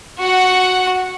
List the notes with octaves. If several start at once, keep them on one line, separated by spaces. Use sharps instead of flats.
F#4 F#5